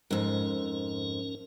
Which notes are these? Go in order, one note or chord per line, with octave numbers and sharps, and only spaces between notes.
F2 G#2 C#4 A#4